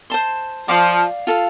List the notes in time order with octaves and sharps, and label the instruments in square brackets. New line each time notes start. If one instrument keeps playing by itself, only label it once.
[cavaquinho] C5 A5 C6
[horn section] F3 [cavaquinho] D5 F5 D6
[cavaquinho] F4 A4 F5